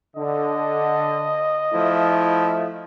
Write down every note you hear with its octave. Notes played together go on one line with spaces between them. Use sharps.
D3 D#5
F3 A3 E4